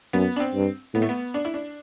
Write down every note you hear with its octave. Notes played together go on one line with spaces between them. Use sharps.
F#2 B3
D4
C4
G2
A2 B3
A3
B3
D4
E4
D4